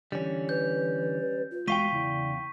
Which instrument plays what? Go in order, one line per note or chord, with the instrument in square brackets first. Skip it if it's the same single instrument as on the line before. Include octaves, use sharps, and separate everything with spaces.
[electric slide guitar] D3 E3 [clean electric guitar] G3 C#4
[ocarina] B4 [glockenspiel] G6
[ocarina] F4
[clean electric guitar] E2 F5 G5 [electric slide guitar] G#3 F#4 [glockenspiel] C#6 B6 D#7
[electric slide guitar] C#3 D5 [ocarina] E4